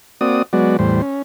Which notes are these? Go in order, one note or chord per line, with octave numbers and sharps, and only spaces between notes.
A#3 C4 F#4 D5 D#6
F#3 G#3 B3 F#4 D5
E2 A2 G3 C5
C#4